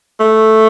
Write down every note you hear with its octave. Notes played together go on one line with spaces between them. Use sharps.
A3